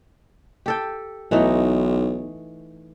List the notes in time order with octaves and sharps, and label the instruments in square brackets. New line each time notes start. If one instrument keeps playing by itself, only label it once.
[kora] G4 A4 G5
[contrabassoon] B1 [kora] E3 A3 D#4